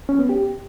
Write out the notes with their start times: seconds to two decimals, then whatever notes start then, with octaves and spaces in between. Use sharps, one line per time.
0.09 C#4
0.19 B3
0.29 G4